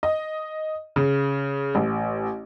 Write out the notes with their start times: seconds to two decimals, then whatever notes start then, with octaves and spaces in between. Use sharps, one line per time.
0.03 D#5
0.96 C#3
1.75 A1